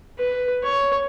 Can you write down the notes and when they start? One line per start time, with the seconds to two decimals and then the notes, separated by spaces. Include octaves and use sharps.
0.19 B4
0.63 C#5